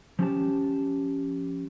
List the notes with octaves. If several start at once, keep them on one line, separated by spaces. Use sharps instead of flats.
F3 C#4 G4 A5